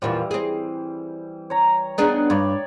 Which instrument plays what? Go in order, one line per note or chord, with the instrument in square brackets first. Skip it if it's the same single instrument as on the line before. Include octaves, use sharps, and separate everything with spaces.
[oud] E2 A#2 F3 [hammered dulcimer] E3 G3
[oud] C4 G#4
[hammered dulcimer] C#5 A#5
[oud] B3 D4 G#4 [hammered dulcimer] D#4
[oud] G2 [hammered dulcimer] C#5 D5